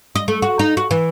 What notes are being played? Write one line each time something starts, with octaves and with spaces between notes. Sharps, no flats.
D#5
A3
F#4
D#4
F#4
E3